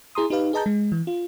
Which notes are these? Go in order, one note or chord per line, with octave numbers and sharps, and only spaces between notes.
E4 G#4 A#5 C6 D#6
D#4 G4 B4 F5
G#4 B4 D#5 A5 A#5 G6
G#3
E3
F4